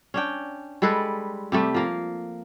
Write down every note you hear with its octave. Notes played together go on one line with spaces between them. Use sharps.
C#4 D4 G5
G3 G#3 A4 B4
C3 G3 A3
F3 A#3